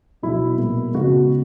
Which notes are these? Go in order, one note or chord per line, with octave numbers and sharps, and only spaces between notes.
B2 F#3 B3 E4
A#2 G#3 B3
C#3 G#3 B3 F#4